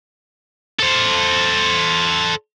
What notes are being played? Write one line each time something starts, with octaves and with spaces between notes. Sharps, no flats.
A4 C5